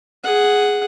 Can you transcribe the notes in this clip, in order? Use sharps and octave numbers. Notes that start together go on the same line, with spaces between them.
G#4 F#5